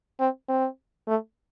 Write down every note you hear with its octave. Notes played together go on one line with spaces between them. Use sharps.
C4
C4
A3